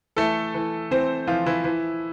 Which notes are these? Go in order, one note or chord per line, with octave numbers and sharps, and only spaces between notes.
E3 A3 A4
E3
E3 C4 C5
E3 F3 F4
E3 E4
E3